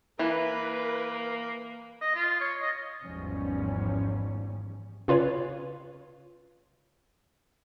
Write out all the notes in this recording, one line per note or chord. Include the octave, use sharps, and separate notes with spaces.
E3 A#3 B4
D#5
F4
C#5
D#5
G#1 E2 G#2 F3 G3 C#4
C#3 F4 B4 C#5